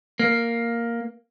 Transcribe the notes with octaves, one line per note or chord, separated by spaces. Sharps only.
A#3